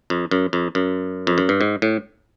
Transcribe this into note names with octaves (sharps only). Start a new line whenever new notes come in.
F2
F#2
F2
F#2
F2
F#2
G2
G#2
A2